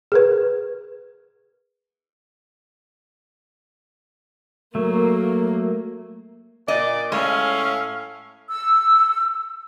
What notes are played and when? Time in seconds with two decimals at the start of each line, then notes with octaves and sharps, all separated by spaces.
0.12 G#4 A#4 B4
4.75 F#3 A3 A#3
6.68 A#2 D5 D#5
7.12 A2 G#3 C#4 E5 F5
8.50 E6